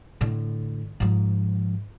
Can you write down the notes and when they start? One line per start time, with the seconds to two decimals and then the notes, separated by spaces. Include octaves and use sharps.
0.21 A2 D3
1.00 G#2 F3